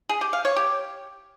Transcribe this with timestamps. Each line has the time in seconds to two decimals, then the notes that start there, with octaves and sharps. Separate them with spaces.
0.09 G#4
0.21 G4
0.33 F5
0.45 C#5
0.56 G4